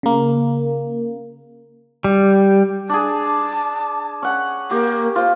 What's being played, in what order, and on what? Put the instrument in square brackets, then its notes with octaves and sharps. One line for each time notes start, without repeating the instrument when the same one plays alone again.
[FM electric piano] C#3 A#3
[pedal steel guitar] G3
[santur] D4 G#4 [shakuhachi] A5
[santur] C#4 F#5
[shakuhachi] A#3 [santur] G4
[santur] F4 [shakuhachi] C5